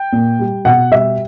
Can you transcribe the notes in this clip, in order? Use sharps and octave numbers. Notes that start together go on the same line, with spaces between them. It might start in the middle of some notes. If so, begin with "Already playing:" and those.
Already playing: G5
A#2
G3
B2 F#5
G3 E5